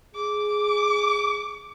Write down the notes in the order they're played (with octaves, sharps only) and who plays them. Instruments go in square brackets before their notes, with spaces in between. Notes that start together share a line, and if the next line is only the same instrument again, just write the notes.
[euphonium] G#4 [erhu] D6